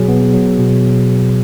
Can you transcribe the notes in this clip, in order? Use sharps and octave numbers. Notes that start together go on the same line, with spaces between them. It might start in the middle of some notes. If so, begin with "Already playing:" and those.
Already playing: B2 F#3 G#4
B3
F#3
B2